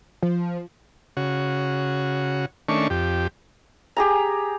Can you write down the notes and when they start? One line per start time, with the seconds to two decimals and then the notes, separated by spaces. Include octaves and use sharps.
0.23 F3
1.17 C#3 F#4
2.69 D#3 A3 C#4 D4 C#6
2.90 F2 G4
3.97 G4 G#4 A#5